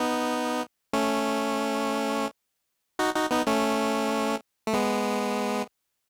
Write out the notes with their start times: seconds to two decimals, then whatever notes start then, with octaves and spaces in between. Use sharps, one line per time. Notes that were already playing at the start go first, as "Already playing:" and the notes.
Already playing: B3 D#4
0.93 A3 C#4
2.99 D#4 F#4
3.15 D#4 F#4
3.31 B3 D#4
3.47 A3 C#4
4.67 A3
4.73 G#3 B3